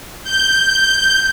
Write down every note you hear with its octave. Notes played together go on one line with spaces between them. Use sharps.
G6